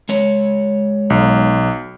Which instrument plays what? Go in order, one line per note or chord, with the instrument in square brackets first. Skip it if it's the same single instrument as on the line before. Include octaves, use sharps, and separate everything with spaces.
[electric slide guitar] G#3 C#5
[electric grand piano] B1